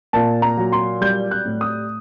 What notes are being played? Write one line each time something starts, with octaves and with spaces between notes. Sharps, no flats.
A#2 A5
A#5
F#3
C6
G3 G6
F#6
A2
D#6